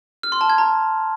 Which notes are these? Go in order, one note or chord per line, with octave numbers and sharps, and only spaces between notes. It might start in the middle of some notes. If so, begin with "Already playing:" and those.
F6
C6
A5
G#6
A#5